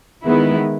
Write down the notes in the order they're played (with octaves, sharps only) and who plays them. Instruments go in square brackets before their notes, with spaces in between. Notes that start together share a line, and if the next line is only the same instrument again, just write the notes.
[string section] D#3 G#3 B3 E4